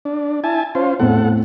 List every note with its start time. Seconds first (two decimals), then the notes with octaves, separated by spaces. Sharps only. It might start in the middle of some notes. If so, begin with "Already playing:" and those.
0.05 D4
0.44 E4 G#5 A5
0.75 C#4 F4 C5
1.00 E2 A2 C4 A4 F#5